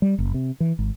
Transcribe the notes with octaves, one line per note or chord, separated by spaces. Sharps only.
G3
F#1
C3
E3
G#1